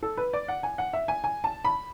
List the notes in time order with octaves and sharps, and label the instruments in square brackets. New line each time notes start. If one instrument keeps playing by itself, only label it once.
[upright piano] A4
B4
D5
F#5
G#5
F#5
E5
G#5
G#5
A5
B5